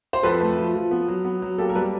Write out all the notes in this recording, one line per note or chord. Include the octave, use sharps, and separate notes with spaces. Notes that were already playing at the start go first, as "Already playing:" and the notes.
C5
F2 A4 B4
A3
F3
F3
B3
F#3
B3
F#3
A#3 G4 A4
A#4
G3 A4 B4